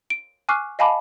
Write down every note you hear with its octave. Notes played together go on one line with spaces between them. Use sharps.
D7
G#5 C#6 D6 F6 F#6 C7
D#5 F5 G#5 A5 B5 D6